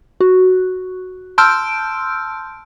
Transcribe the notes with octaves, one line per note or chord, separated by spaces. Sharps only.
F#4
A5 C6 E6 F6 G6 D7